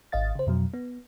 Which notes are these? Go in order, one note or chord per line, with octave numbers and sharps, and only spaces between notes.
G#1 D#5 F5 A6
C#3 C5
F2 B2 F#3
B3